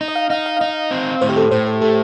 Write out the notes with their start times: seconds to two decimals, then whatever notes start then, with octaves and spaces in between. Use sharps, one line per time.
0.01 D#4
0.08 D#5
0.15 F5
0.30 D#4 F5
0.46 F5
0.57 F5
0.60 D#4 D#5
0.91 C4
1.21 A2 C5
1.29 G4
1.36 A4
1.51 A2 C5
1.66 A4
1.81 A3 A4